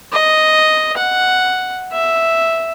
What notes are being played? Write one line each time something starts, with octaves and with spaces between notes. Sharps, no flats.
D#5
F#5
E5